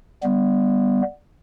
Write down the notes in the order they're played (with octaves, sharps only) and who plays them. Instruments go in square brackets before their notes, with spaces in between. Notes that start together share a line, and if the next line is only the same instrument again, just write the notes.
[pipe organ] G3 B3